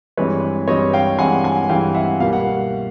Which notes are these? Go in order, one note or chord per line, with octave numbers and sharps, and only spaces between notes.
G2 E3 G#3 C4 B4 C#5
G2 E3 G#3 C4 C#5 D#5
F5 G5
G2 E3 G#3 C4 F#5 G#5
F#5 G#5
G2 E3 G#3 C4 F5 G5
E5 F#5
B2 G3 A#3 F5
F#5